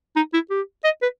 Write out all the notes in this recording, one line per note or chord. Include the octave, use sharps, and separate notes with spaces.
D#4
E4
G4
D#5
B4